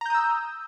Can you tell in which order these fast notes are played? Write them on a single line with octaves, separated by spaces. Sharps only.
A#5 G6 D#6 E6